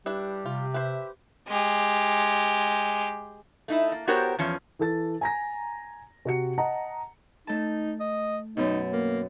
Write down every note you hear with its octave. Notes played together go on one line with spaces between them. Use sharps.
G3 D4 E4 G4 B4
C3 F4
B4 C5 E5
G#3 G4
A3 D#4 E4
A#3
B3 F#4 G4 A#4 C5 C#5
E2 F3 C#4
E3 A4 A6
G#5 A#5 A#6
C3 F#4 C#7
D#5 F#5 A5 A#5
A3 D#4 A5
D#5
F#2 B2 D#4
A#3